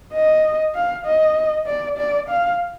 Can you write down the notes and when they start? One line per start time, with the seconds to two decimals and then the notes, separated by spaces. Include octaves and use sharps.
0.13 D#5
0.74 F5
1.05 D#5
1.66 D5
1.98 D5
2.29 F5